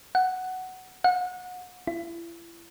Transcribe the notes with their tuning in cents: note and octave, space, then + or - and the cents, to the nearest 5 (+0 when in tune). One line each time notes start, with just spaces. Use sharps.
F#5 +5
F#5 -30
E4 +35